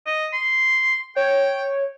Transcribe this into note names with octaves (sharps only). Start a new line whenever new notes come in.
D#5
C6
C#5 G5